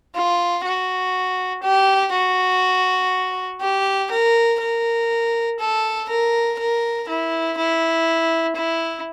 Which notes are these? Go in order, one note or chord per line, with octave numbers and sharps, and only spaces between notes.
F4
F#4
G4
F#4
G4
A#4
A#4
A4
A#4
A#4
E4
E4
E4